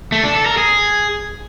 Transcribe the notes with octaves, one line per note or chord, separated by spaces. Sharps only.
A3
D4
A4
A#4
G#4